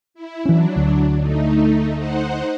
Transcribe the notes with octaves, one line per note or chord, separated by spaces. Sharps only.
E4
E3 F#3 C#4 D4
D2
A3 D#4
D#4 C5 F#5